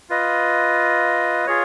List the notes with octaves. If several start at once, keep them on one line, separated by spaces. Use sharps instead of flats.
F4 B4 D#5
F4 G#4 C#5